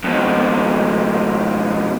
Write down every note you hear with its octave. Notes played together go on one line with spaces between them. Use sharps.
F2 B2